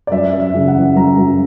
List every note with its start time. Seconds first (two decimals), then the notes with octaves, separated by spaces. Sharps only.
0.07 D5
0.11 F#2 E5
0.33 F#2
0.40 E5
0.54 C#3
0.68 F#5
0.75 E3
0.95 F#2 A#5
1.17 F#2